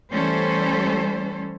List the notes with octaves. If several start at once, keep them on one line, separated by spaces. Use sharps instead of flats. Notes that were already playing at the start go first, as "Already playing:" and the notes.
E3 G3 A3 C#4 A4 C5